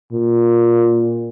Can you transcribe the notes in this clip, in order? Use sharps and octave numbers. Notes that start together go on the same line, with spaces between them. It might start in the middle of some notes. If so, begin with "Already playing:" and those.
A#2